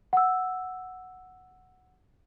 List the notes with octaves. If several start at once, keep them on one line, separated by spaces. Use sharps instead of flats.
F#5 E6